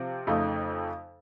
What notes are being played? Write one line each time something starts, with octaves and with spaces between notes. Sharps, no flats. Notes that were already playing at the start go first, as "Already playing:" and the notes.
Already playing: C3 F3 C4 F4
F2 C#3 A3 D#4